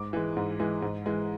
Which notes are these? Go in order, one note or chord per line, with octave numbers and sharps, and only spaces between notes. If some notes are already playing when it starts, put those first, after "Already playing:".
Already playing: G#2 D6
E3 G#3
G#2
E3 G#3
G#2
E3 G#3